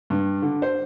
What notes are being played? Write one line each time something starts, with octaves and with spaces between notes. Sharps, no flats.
G2
D3
C5